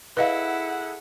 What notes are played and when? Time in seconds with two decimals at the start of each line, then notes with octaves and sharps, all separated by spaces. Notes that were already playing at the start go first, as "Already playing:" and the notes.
0.17 E4 G#4 A4 B4 D#5 F5 F#5